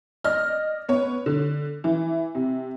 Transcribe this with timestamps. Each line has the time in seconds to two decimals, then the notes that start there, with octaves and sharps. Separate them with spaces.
0.24 D5 D#5 F6
0.89 B3 C#5
1.26 D3
1.84 E3
2.35 C3